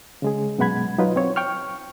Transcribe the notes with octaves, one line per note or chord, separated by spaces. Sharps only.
C#3 G#3 G#4
F#2 B2 G#3 F#5 B5 G#6
F#3 D#4 F4 B4
F#2 C4 C#5
G5 C#6 F6